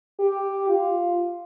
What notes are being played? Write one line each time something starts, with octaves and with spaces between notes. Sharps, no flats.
G4
F4